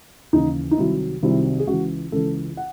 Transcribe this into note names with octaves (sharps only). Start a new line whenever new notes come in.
D#2 C#3 E3 D#4
D#4
C2 C3 D#3 F#3 E4
C2 C3 D#3 F#3 E4
G#4
C#2 C#3 E3 F#4
C#2 C#3 E3 A4
F#5